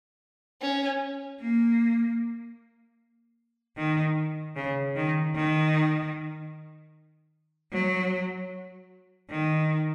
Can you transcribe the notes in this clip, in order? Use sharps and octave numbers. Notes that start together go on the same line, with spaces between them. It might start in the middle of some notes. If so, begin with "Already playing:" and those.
C#4
A#3
D#3
C#3
D#3
D#3
F#3
D#3